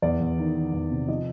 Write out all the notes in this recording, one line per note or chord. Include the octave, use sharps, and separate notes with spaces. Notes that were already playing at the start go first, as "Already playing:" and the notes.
E2 D5
E2
D#3
D#3
E2
C3
F3 D#5